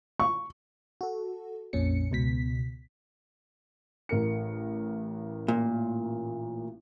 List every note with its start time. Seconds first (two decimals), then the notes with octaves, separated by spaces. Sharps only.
0.20 C#6
1.01 F#4 A4
1.73 A#1 F2 A#2 C#4 C#7
2.11 C#2 B2 B6
4.09 A1 A#4 C#7
5.48 A#2